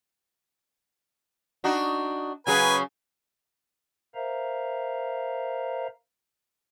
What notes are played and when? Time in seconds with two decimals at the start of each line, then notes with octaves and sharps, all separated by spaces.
1.64 D4 D#4 F#4
2.47 C#3 F#3 G#4 B4 G#5
4.15 A#4 C5 E5 F5 A#5